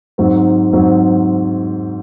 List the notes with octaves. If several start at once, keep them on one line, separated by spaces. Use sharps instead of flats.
G#2 F#3 C4
G#2 F#3 C4